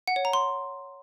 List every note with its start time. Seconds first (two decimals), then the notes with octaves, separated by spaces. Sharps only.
0.08 F#5
0.16 C#5
0.25 A#5
0.33 C6